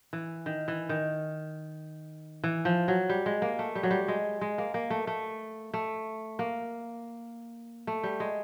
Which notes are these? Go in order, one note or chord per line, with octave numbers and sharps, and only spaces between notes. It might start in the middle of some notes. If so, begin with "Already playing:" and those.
E3
D#3
E3
D#3
E3
F3
F#3
G3
G#3
A#3
A3
G3
F#3
G3
G#3
G#3
A#3
A#3
A3
A3
A3
A#3
A3
G3
G#3